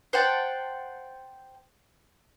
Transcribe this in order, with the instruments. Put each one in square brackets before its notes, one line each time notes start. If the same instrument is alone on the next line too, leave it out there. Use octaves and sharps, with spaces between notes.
[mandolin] C5 F#5 G5 A5